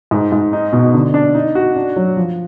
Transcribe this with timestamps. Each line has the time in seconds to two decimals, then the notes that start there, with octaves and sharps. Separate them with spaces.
0.11 G#2
0.32 G#2
0.53 D#4
0.73 B2
0.94 D3
1.14 D4
1.35 D#4
1.55 F#4
1.76 D4
1.96 F#3
2.17 F3